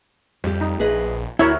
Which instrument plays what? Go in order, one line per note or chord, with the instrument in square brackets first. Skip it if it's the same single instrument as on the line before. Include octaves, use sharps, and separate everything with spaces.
[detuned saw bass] F2 [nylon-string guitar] G3 G4
[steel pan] D#4
[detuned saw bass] A#1 [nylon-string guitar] G#4 B4 D#5
[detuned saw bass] D2 [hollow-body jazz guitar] E4 [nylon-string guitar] F#4 G4 [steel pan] A#4 C#5 E5